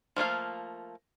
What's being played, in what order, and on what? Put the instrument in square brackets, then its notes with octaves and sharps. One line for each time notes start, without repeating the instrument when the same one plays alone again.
[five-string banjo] F3 A3 A#3 F5